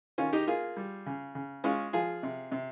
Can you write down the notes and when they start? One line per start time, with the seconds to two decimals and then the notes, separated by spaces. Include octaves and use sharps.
0.18 D#3 C#4 F4
0.33 D#4 G4
0.47 A#3 F4 G#4
0.77 G3
1.06 C#3
1.35 C#3
1.64 G#3 C#4 F4
1.93 F3 F4 G#4
2.23 C3
2.52 C3